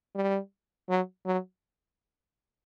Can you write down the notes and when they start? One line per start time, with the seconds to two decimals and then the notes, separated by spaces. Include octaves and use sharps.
0.15 G3
0.89 F#3
1.26 F#3